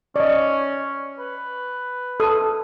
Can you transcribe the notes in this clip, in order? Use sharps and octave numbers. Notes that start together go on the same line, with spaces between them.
C#4 D5 D#5
B4
A4 D#6